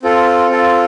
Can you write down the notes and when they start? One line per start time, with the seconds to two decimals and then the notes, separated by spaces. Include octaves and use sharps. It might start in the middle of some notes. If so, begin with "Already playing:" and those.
0.03 C4 F4 A4
0.49 C4 F4 A4